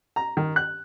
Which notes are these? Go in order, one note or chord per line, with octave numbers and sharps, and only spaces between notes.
A#5
D#3
F#6